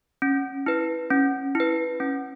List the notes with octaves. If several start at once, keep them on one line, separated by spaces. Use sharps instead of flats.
C#4
E4 B4
C#4
E4 B4
C#4